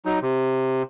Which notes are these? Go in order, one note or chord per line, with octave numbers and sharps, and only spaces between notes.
F#3 D#4
C3